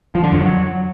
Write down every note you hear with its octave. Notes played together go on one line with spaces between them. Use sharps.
F3
D3
F2
F#3